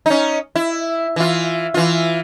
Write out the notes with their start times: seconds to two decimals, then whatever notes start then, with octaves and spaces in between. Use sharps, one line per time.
0.06 C#4 D#4
0.56 E4
1.16 E3 F4
1.74 E3 F4